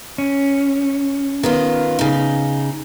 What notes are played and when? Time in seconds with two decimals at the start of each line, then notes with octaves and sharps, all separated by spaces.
0.18 C#4
1.43 D#3 B3 F4
1.99 C#3 D#4